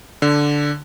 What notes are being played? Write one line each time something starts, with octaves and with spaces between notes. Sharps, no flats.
D3